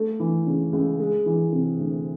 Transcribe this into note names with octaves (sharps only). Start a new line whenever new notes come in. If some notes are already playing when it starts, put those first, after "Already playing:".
Already playing: A3
E3
C#3
C#2
G#3
E3
C3
D2